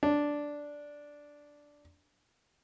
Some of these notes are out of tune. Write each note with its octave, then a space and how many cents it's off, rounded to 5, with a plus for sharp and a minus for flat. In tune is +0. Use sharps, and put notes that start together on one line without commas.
D4 -5